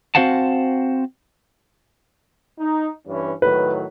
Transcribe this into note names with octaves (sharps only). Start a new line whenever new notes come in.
C4 F#4 C5 F5 F#5 A5
D#4
G2 E3 C#4
A2 D#3 F#3 B4